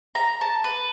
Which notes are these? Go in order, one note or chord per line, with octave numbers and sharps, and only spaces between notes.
A#5
A5
B4